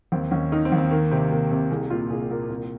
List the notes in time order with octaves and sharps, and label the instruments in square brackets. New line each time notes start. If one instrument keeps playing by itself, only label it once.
[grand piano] D#2 C4
D#2 C#4
D#3 D#4
C4
D#2
C4
D#3 A#3
C3 C4
C3 A#3
C3 C4
C2 G#4
A#2 F4
C2 G#4
A#2 A#4
C2 A#4